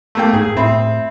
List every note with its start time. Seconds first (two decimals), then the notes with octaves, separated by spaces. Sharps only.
0.15 A3 A#3 G5
0.33 G#2 G#4
0.57 A2 C4 E5 B5